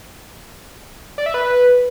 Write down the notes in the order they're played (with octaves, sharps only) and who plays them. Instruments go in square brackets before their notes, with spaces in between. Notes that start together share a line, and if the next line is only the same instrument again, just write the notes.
[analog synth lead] D5
E5
B4